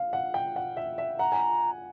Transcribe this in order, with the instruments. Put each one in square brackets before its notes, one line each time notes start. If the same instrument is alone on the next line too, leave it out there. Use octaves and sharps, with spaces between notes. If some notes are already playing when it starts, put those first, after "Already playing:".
Already playing: [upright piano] F5
F#5
G5
F#5
E5
E5
[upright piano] F#5 [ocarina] A#5
[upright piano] G#5